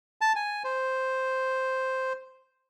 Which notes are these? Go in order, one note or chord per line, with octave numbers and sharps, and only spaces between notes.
A5
G#5
C5